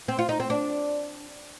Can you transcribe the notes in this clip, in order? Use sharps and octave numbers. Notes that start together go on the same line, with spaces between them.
C4
F4
D#4
C4
D4